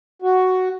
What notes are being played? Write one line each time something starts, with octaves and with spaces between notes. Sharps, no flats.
F#4